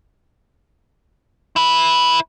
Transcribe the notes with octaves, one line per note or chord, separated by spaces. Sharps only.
E4 B4